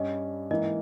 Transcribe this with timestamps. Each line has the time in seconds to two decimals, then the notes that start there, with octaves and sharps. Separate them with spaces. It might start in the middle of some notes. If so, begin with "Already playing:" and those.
Already playing: G2 G3 C#4 D#5
0.50 G#2 E3 A#3 D#5